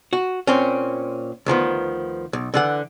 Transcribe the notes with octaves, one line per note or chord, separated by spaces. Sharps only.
F#4
A#2 C4 C#4
D2 D#3 F3 B3
B1
D3 E3 F#5